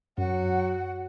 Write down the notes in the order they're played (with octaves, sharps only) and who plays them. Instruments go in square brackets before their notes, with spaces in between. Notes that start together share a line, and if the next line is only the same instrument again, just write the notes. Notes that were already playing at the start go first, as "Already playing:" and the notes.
[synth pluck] F#2 [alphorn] F#3 [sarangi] F#4 [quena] F#5